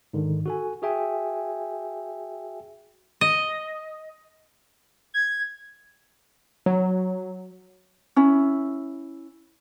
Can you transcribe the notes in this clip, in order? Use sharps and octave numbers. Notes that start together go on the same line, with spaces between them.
G#2 D3 D#3
F#4 A4 G#5
F#4 G#4 E5 G5 G#5
D#5
G#6
F#3
C#4 E4